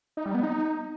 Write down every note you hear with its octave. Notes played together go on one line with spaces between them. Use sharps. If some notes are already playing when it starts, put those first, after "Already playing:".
D#4
G3
B3
D#4